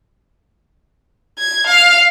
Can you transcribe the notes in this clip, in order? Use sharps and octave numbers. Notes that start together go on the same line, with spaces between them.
G#6
F5